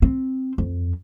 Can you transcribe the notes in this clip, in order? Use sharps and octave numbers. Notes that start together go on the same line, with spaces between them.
C4
F2